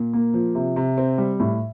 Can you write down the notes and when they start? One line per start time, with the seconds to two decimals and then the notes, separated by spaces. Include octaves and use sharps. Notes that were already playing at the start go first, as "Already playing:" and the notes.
Already playing: A#2
0.13 A#3
0.34 F3
0.55 C3
0.76 C3
0.98 C4
1.18 G3
1.40 A2